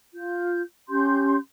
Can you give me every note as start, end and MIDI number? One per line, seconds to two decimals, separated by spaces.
0.15 0.61 65
0.15 0.61 91
0.89 1.36 61
0.89 1.36 67
0.89 1.36 84
0.89 1.36 91